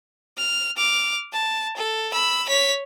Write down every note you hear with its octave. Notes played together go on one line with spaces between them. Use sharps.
F6
D6 F6
A5
A4
B5 E6
C#5 B6